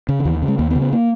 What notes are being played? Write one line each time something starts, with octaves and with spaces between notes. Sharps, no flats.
C#3
D#3
D#2 E3
C#3
G#3
D#2 A#3
B3
C#3
B3
A#3